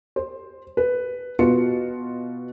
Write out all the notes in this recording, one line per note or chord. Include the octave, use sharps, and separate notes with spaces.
C5
B4
B2 F4 F#4 B4 C#7